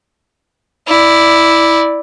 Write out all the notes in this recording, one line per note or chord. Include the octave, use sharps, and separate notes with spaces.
E4 D5